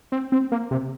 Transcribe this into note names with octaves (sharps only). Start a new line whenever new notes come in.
C4
C4
A#3
C3